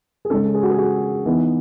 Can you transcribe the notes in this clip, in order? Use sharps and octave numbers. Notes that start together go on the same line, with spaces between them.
G#4
C#3 G#3 C#4 A4
G#4
F#4
G#4
F#4
E3 B3 D#4